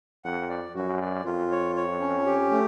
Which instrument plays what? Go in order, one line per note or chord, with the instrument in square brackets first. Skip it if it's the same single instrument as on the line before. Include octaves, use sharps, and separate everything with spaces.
[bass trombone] F2 [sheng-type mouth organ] F#5
[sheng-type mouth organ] D5
[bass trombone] F#2 [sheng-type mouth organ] F#4
[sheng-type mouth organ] D5
[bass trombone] F2 [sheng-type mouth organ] F4
[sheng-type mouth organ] C#5
C#5
C#4
G4
A3